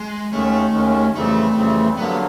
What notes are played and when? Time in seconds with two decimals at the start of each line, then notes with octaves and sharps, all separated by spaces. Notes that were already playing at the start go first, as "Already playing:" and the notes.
Already playing: G#3
0.32 D#2 D#3 G#3 A3 C#4
0.74 D#2 D#3 G#3 C#4
1.14 F2 C#3 E3 G3 A3 C4
1.56 F2 C#3 E3 G3 C4
1.97 G2 D3 F#3 A#3 B3